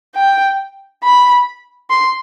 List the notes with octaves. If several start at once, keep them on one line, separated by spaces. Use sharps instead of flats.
G5
B5
C6